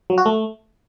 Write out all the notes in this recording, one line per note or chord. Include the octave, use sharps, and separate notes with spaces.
F#3
F#4
A3